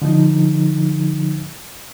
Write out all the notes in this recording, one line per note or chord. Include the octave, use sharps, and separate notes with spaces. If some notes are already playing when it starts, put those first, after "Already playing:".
D3 F3 D#4